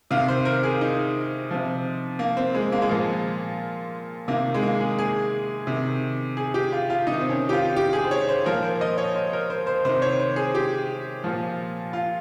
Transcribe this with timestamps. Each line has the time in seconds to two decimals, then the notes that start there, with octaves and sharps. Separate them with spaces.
0.11 C3 D#3 F5
0.28 C5
0.45 A#4
0.63 G#4
0.81 D#4
1.51 C3 F3
2.19 A#3
2.37 C4
2.55 G#3
2.72 A#3
2.82 G#3
2.89 A#2 F3 A#3
4.28 C3 D#3 A#3
4.54 G#3
4.63 A#3
4.80 G#4
4.98 G#4
5.67 C3 D#3
6.37 G#4
6.54 G4
6.72 F4
6.90 F4
7.07 C3 D#3 D#4
7.21 C4
7.30 C#4
7.49 G4
7.53 F4
7.76 G4
7.93 G#4
8.05 C5
8.11 C#5
8.29 C5
8.46 A#2 F3 A#4
8.62 C5
8.81 D#5
8.98 C#5
9.15 C5
9.33 A#4
9.50 C5
9.67 C5
9.85 C3 D#3 C5
10.02 C#5
10.19 C5
10.36 G#4
10.55 G4
11.24 A#2 F3
11.93 F4